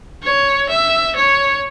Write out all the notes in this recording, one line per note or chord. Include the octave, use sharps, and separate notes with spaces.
C#5
E5
C#5